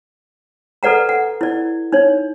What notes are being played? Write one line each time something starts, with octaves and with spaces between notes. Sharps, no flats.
A4 B4 D5 F#5 A#5
F#5
E4 D5
D#4 C#5